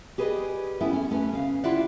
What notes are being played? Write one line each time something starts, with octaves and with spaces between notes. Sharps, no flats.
G4 G#4 B4 C5 D5 D#5
B3 C#4 E4 A4 E5 G5
C#4
A3 C#4 B4
C#3 F5
E4 F4 G4 D5 E5 F#5